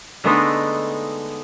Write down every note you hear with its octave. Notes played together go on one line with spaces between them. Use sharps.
D3 G#3 A3 B3 D4 D#4